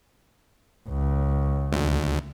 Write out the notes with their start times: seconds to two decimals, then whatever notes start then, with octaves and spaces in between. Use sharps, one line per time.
0.88 C#2
1.73 D2